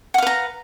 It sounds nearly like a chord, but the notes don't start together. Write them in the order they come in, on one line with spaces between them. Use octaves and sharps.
F#5 F5 B4 A#5